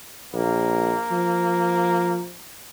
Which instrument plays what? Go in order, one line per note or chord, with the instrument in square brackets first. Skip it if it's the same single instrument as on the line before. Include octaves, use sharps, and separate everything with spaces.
[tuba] A#1 [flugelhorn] A#3
[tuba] F3